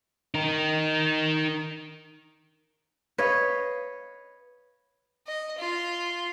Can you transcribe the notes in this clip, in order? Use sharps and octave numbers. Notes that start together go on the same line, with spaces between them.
D#4 A#4
B4 C#5 D#5 F5
D#5
F4